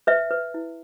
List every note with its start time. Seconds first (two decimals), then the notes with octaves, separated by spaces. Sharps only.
0.07 B4 E5
0.31 B4
0.54 E4